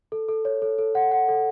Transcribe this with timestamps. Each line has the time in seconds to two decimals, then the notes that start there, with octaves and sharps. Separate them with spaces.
0.12 A4
0.29 A4
0.45 C#5
0.62 A4
0.79 A4
0.95 F#5
1.12 F#5
1.28 A4